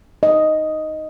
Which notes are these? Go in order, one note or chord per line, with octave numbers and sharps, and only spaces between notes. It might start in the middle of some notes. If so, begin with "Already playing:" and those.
D#5